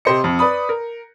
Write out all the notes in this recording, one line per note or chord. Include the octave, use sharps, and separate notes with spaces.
C3 G4 C5 D#5 C#7
F2
B4 D5 B5 D#6
A#4